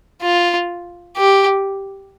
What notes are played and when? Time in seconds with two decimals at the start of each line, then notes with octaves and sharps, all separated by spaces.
0.22 F4
1.18 G4